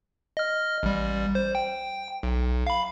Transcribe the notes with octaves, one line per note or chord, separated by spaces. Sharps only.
D#5 F6
A1 G3
C5
G5
B1
F5 B5